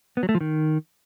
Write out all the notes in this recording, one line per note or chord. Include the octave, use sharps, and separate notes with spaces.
B3
F#3
A3
F3
D#3